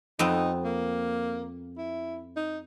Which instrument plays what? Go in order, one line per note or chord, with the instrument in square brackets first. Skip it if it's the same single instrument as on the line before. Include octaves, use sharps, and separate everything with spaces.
[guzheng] F2 B3 C4 [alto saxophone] D#4
[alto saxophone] A#3
E4
D#4